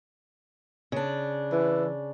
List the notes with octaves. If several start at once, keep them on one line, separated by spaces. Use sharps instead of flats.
C#3 D4
E3